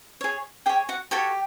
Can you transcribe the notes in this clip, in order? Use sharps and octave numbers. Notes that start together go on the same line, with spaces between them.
G#4 C#5
G4 G#4 C#5 G5
F#4 F#5
F#4 G4 A4 C#5 G5